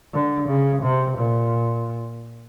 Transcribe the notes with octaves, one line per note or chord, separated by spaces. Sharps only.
D3
C#3
C3
A#2